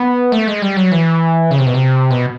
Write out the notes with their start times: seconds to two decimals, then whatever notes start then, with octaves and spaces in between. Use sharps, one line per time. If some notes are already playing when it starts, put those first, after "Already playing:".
Already playing: B3
0.32 A3
0.47 G#3
0.62 G3
0.77 F#3
0.92 E3
1.51 C#3
1.58 C3
1.66 B2
1.74 C3
2.10 B2